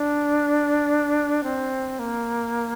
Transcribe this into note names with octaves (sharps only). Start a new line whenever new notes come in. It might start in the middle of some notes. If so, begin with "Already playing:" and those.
Already playing: D4
C4
A#3